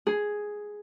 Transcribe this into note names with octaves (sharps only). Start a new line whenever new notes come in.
G#4